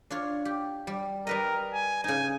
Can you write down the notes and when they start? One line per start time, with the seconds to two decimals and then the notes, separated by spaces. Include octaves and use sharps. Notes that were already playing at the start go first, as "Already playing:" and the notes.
0.11 D4 F4 C#5
0.45 G4
0.87 G3
1.27 G3 A#4 B4 D#5
1.73 G#5
2.04 C#3 D#4 G#5